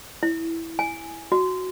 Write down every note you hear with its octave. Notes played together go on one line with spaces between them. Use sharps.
E4
G#5
F#4